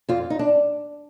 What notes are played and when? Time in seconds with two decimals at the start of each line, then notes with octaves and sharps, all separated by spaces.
0.09 F2 F4
0.30 D#4
0.39 D4